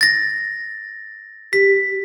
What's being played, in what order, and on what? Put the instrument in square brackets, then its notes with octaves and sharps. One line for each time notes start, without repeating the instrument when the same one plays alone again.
[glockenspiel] A6 A#6
[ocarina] G4 [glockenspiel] B6